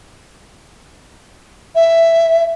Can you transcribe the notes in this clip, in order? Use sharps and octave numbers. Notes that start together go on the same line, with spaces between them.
E5